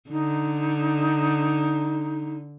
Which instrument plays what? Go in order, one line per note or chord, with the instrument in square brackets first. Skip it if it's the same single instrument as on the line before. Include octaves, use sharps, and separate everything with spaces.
[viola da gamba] D3 [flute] D#4